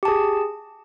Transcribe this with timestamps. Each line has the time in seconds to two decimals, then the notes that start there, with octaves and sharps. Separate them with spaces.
0.03 G4
0.05 A5
0.08 G#4